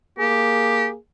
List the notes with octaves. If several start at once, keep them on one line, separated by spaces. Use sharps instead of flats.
A#3 G4 G#4